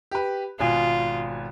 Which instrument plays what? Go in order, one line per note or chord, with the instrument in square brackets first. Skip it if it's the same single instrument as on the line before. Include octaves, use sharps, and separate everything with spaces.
[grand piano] G4 B4
[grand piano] G#1 B2 G#5 [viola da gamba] F4